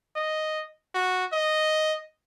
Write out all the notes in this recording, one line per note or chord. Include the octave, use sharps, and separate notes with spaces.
D#5
F#4
D#5